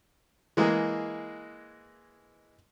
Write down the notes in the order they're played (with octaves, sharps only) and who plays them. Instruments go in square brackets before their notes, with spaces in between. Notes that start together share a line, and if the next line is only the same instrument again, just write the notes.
[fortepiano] E3 G#3 A#3 G#4